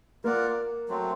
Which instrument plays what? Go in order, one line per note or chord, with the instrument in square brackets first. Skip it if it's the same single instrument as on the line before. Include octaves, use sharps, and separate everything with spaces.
[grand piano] A#3 [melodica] F4 A#4 D5 F#5
[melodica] F#3 A3 C4